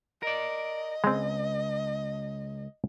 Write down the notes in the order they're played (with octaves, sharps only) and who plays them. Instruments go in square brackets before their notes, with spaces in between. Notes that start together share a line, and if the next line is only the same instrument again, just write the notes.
[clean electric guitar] A#4 D5 [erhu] D#5
[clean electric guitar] C#2 [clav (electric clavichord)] G#3 C4